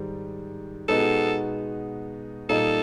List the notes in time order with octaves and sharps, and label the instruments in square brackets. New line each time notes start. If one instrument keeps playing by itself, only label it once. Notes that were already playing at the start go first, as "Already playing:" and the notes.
Already playing: [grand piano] G#2 D#3 G3
[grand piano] B2 G#3 B3 D#4 F#4 [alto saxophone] A4
[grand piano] A#2 G3 A#3 D#4 [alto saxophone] A4